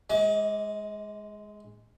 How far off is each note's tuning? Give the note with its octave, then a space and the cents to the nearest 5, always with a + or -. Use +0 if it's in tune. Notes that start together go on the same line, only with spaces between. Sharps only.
G#3 +0 D#5 +35 D6 +0